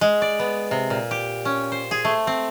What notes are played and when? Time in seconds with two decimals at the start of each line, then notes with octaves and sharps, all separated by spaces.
0.01 G#3
0.22 D5
0.39 B3
0.71 C3
0.90 A#2
1.11 G4
1.45 C#4
1.72 C5
1.91 G#4
2.05 A3
2.27 C4